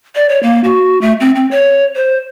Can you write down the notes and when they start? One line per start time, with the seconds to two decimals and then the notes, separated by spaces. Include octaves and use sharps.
0.15 D5
0.29 C#5
0.43 A#3
0.64 F#4
1.01 A3
1.20 C4
1.36 C4
1.51 C#5
1.95 C5